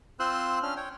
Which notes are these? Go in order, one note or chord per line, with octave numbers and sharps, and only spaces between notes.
C4 F4 C5 C6 E6 F#6
C#4 D4 F6
C#5 G5